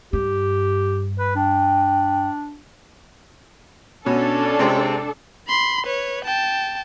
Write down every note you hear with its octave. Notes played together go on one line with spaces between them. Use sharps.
G2 G4
B4
D4 G5
B2 C#4 D4 A4
C3 G#3 C4
B5 C6
B4 C#5
G5 A5